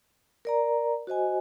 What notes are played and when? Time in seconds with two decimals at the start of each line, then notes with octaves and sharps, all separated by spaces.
0.45 A#4 D5 A#5
1.07 F#4 C5 D#5 G#5